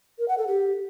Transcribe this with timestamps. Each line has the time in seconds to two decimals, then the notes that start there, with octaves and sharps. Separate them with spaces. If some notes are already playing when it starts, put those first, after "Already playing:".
0.19 A#4
0.28 F#5
0.38 A4
0.47 G4